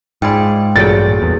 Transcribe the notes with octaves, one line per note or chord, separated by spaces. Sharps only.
G#2 F4 G#4 D5 G5 B5
A1 G2 A#2 F#3 G#4 A4 G5 A6
E2